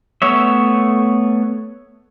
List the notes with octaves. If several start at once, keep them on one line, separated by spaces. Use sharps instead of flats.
A3 B3 C#5 E5